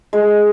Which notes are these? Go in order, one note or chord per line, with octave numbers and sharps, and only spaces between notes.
G#3